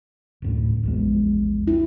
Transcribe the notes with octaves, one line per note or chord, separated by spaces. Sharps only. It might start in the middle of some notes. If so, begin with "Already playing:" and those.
D1 F#2 A2
A#1 E2 G#3
E4